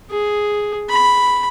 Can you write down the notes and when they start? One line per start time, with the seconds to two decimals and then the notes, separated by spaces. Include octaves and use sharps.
0.11 G#4
0.89 B5